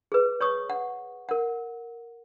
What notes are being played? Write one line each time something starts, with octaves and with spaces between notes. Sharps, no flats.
G#4 B4
C#5 C#6 D#6
F#5
A#4 F#5